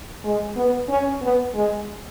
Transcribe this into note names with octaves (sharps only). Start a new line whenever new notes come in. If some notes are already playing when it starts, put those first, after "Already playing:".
G#3
B3
C#4
B3
G#3